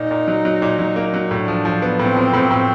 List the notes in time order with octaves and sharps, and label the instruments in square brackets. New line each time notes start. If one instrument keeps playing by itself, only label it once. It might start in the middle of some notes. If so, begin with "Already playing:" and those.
Already playing: [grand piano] A#2 [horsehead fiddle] D#4
[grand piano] A#2
F#3
F#3
A#2
F#3
A#3
F#3
[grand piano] A2 [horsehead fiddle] D4
[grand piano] F3
F3
B3
[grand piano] A2 [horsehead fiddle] C4
[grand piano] F3
A2
A2